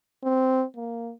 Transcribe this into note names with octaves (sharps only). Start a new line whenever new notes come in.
C4
A#3